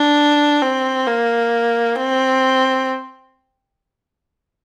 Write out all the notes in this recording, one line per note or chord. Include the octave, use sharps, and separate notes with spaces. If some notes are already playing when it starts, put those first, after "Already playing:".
Already playing: D4
C4
A#3
C4